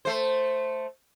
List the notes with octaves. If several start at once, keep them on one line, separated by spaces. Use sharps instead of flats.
A3 C5